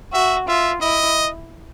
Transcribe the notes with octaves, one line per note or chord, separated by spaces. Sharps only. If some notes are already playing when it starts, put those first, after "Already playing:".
F#4 E5
F4 E5
E4 D#5